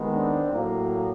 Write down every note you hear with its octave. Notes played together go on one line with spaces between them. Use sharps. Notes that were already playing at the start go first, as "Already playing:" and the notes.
Already playing: D#2 D#3 G#3 B3
C4 D4
A2 F#3 A#3